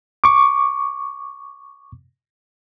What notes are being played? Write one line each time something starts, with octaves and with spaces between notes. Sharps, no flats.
C#6 D6